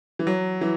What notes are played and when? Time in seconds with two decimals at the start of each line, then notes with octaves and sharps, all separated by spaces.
0.19 E3
0.27 F#3
0.61 E3